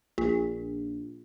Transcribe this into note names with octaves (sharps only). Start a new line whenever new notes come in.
A#1